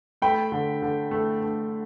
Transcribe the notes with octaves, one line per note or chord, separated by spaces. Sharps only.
A3 G5 B5
D3
D3
A3
A3